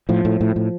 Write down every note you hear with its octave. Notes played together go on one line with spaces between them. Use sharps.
A2 F3
A2
A2
A2